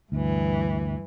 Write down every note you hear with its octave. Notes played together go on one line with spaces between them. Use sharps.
D2 G2 E3